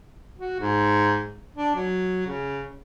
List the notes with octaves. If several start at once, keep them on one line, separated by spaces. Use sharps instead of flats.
F#4
G#2
D4
F#3
C#3